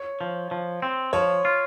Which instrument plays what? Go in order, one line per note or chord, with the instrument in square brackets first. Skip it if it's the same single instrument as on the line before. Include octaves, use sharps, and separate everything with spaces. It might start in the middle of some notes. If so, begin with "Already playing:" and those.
Already playing: [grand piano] C#5
[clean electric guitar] F3
F3
C4
[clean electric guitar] F3 [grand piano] C#5
[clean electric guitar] F4